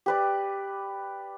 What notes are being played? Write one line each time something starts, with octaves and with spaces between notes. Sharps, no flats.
G4 B4 D5